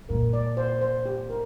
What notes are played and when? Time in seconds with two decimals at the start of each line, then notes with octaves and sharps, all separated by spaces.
0.09 A#2 A#4
0.33 D5
0.57 C5
0.81 C5
1.05 G4
1.30 A#4